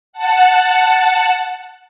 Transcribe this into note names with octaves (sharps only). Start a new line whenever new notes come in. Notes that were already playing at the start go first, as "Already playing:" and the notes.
F#5 A5